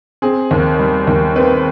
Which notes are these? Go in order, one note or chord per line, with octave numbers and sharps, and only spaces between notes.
C4 G#4
D#2
G3
D#2
C4 B4